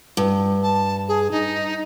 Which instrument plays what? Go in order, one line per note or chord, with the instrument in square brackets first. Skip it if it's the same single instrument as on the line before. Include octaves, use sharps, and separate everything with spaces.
[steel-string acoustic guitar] G2
[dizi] A5
G#4
D#4